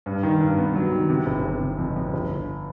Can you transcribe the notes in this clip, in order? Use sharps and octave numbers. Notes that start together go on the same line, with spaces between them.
G2
D#3
G2
B3
F#3
D#3
C3
G1
G1
C3
F2
F2
G1
D3